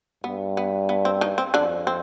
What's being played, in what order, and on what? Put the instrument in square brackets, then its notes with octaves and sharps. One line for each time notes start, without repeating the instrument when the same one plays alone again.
[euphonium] G2 [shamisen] B3
[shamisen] B3
B3
C4
D#3 D#4
C4
[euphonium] F2 [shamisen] D3 D4
[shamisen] C4